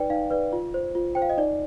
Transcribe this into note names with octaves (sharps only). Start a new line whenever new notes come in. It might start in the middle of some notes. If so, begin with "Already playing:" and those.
Already playing: D#4 B4 D5 G5
D#4 F5
B4 D5
F4
C5
F4
C5 G5
F5
D#5
D#4 D5